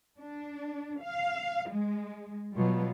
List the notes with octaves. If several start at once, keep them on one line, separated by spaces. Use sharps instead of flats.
D4
F5
G#3
B2 F#3 G3 F4